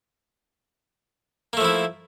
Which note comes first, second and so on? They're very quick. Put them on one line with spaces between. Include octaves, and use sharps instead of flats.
A#3 A3 F3 E4